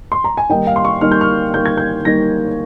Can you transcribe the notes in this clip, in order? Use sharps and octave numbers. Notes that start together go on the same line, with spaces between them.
C6
A#5
G#5
D#3 G3 A#3 D#4 G5
F5
C6
C#6
D#3 G3 A#3 D#4 F6
G6
F6
D#3 G3 A#3 D#4 G6
G#6
G6
D#3 G3 A#3 D#4 A#6